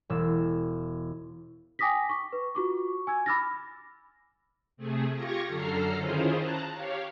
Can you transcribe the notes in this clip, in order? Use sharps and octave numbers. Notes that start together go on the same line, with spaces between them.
E1 E6
G5 G#5 D6 D#6 A#6 B6
C#6 D6
B4
F4 F#4 C#6 D6
G#5 E6 G#6
B5 D6 E6 F6 A6 A#6
C3 A3 G#4
F4 G4 C#6 G#6 A#6 C#7
F#2 D3 A4 A#5 F6 C7
D#3 C#4 E4 F4 G#4 C5
A5 A#5 F#6
G4 C#5 F5